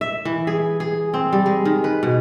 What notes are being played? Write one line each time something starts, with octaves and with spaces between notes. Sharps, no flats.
E5
E3
G#4
G#4
C4
G3
G#3
D#3
B4
B2